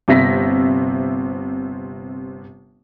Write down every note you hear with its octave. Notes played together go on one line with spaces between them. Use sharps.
G1 C3 C4 E5 A#6 B6